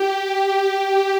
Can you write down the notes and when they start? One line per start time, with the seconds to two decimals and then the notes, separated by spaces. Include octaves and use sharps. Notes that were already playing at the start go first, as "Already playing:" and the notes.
Already playing: G4
0.15 G4